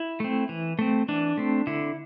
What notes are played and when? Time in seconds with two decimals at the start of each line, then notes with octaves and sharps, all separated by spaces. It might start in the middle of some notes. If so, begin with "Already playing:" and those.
Already playing: E4
0.20 A3 C4
0.49 E3
0.79 A3 C4
1.08 E3 D4
1.38 A3 C4
1.67 D3 E4